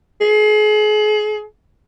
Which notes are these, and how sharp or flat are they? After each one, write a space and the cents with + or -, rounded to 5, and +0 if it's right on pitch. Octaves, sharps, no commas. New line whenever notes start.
G#4 +35